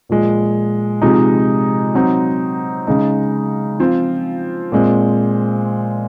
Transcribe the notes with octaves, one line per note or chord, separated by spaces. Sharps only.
A#2 F3 G#3
C3 F3 G#3 D#4
F#3 C4 D#4
C#3 G#3 D#4
F3 C4 F4
A#2 G#3 C4